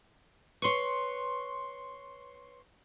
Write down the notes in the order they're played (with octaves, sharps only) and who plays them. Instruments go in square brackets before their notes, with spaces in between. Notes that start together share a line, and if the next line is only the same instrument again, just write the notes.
[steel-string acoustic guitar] B4 C#5 [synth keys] C6 C#6